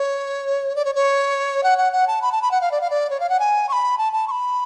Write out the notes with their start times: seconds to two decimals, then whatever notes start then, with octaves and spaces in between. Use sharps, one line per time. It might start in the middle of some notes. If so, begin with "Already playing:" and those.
Already playing: C#5
0.76 D5
0.85 C#5
0.95 C#5
1.63 F#5
1.78 F#5
1.93 F#5
2.07 A5
2.22 B5
2.32 A5
2.42 B5
2.51 F#5
2.61 F5
2.72 D5
2.81 F5
2.90 D5
3.10 C#5
3.20 F5
3.30 F#5
3.40 G#5
3.69 C#6
3.73 B5
3.98 A5
4.13 A5
4.28 C#6
4.31 B5